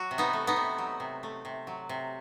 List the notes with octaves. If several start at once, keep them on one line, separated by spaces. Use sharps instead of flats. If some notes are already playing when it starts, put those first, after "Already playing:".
Already playing: F#3 F#4
C3
B3 D#4
A3
B3 D#4
C3
F#3
C3
A3
C3
F#3
C3